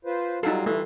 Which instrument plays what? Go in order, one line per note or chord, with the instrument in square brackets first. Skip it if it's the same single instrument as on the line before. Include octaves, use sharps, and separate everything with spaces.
[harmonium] F4 B4 C5
[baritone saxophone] F#3 [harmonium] G3 F4 F5 [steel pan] D#4 A4
[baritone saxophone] E3 [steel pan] A3